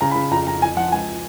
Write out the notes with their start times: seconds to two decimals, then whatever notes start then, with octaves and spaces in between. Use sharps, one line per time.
0.01 C#3 A#5
0.11 B5
0.16 C#3
0.31 F2 A#5
0.47 F2 A#5
0.62 F2 G#5
0.76 F3 F#5
0.92 C#2 G#5